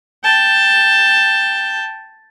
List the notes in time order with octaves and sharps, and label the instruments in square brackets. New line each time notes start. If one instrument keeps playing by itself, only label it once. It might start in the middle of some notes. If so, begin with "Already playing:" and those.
[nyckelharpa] G5 A5